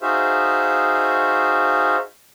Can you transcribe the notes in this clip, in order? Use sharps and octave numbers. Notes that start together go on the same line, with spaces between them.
D#4 F#4 G#4 C5 E5 F5